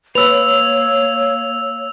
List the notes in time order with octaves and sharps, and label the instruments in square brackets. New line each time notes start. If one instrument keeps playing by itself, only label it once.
[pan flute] A#3 [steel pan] B4 [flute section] C#5 [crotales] E6 F7